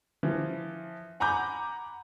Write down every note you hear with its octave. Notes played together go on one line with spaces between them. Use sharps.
E3 F3
F#5 G#5 A#5 B5 D6 G6